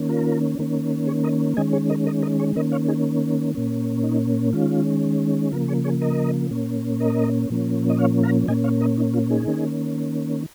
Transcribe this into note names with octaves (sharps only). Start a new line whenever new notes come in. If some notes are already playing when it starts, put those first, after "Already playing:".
Already playing: D#3 A#3 C#4
F4 A#4
D#3 A#3 C#4
G#4 C#5
A#4 D#5
D#3 G#3 C#4 D#5 G#5
G#4 C#5
A#4 D#5
A#4 D#5
A#4 D#5
G#4 C#5
D#3 A#3 C#4 A#4 D#5
C#5 F5
D#4 G#4
A#2 A#3 C#4
D#4
D#3 G#3 C#4 F4
C#3 F3 A#3 F4 A#4
G#4 C#5
G#4 C#5
A#4 D#5
A#2 A#3 C#4
A#4 D#5
A#2 F3 A#3 C#4
D#5
C#5 F5
F5 A#5
A#2 A#3 C#4 D#5 G#5
C#5 F5
A#4 D#5
D#4
F4
D#4 G#4
D#3 A#3 C#4